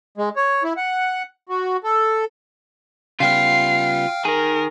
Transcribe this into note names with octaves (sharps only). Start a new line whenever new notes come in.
G#3
C#5
E4
F#5
F#4
A4
C#3 G3 B3 F4 F5 G5 F6 C7
D#3 G#4 A#4